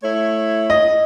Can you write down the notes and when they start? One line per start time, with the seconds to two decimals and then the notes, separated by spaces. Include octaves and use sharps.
0.03 A3 E4 C#5
0.70 D#5